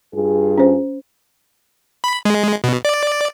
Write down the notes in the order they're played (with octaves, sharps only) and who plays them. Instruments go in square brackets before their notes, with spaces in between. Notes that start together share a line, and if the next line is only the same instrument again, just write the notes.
[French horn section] G2 F4 G#4
[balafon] C#4 C5
[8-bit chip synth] B5
G#3
B2
D5